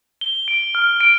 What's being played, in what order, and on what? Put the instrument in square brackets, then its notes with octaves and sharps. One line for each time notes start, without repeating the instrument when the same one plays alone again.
[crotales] G7
D7
F6
D7